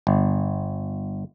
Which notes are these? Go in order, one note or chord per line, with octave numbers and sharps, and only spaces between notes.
G1